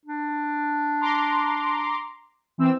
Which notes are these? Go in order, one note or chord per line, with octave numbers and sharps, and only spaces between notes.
D4
A#5 C6 D6
E3 C4 E6